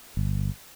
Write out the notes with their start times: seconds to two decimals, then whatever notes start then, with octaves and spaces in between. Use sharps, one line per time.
0.17 G1